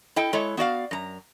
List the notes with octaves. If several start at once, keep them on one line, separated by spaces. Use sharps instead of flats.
E4 A4 D#5 G5
G#3 E4 A4 C#5
B3 F#4 D5 F5
F#2 A#5